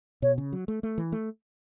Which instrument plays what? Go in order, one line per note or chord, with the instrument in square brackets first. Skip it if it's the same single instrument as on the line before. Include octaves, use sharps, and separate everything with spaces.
[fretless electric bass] B2 [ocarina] C#5
[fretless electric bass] C#3
F#3
A3
A3
E3
A3